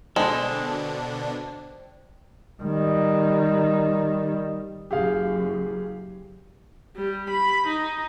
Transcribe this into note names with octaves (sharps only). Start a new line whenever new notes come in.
B2 D3 G#3 D4 A4 C5 D5 G5
D#3 G3
F#1 F#2 G4 G#4 F5
G3
B5
D#4